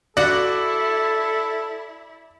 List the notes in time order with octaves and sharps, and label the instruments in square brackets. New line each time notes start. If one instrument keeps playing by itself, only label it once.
[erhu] E4 [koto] F#4 F#5 [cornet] A4 [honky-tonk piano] D5